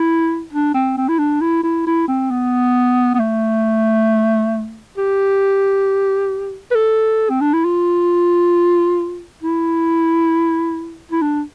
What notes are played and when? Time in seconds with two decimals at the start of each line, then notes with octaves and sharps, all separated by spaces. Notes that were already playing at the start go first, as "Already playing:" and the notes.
Already playing: E4
0.53 D4
0.74 C4
0.97 C4
1.09 E4
1.19 D4
1.41 E4
1.63 E4
1.87 E4
2.08 C4
2.31 B3
3.15 B3
3.20 A3
4.97 G4
6.71 B4
6.75 A4
7.30 C4
7.41 D4
7.53 E4
7.65 F4
9.42 E4
11.12 E4
11.22 D4